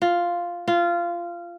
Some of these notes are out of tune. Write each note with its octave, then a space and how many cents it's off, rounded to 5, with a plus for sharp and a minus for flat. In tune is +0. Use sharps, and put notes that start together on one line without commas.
F4 +0
F4 -15